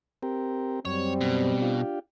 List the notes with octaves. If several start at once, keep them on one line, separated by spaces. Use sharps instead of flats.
C4 G4 A#4
F#2 G3 C4 C#5
B2
D4 F4 G4